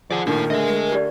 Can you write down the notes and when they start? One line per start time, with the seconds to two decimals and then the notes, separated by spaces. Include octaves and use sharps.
0.10 F3 G#4 D5 F#5
0.27 A#2 D#3 D4 E4 A4 A#4
0.50 D3 A3 G#4 D#5 E5
0.92 G4 D5